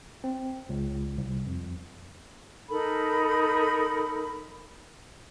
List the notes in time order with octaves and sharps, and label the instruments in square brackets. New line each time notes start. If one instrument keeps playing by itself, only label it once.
[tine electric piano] C4
C#2
C2
F2
[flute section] D#4 A4 A#4 B5